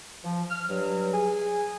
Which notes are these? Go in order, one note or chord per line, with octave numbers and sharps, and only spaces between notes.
F3
F6
G2 F#3
G#4 G#5